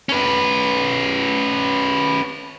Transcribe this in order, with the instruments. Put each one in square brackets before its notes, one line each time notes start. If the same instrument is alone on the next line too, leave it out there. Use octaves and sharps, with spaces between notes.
[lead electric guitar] C#4 B4